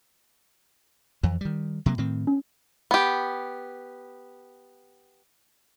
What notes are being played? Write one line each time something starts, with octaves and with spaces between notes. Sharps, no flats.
F2 E3
D#3 G3
C3 F#3 A#3
A2 D#3 C4
C#4
B3 G4